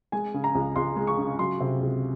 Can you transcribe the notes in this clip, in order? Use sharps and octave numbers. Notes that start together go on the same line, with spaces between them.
G#3 G#5
C#3
A#5
C#2
C#2 C6
G#3
C#6
C#3
F#3 C6
C3
C#2